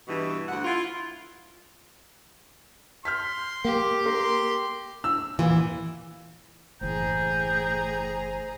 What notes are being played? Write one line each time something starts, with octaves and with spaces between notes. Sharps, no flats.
G2 B2 E3
D2 F#5
E4 F4
C6 F6 G6 B6
A#3 G4
A#4 C6
E6
E2 A#2 E3
F#1 A2 E3 G#4 C5 G5 A#5